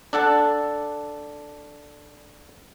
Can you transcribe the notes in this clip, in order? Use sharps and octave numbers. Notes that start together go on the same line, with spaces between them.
D4 A4 F#5 A5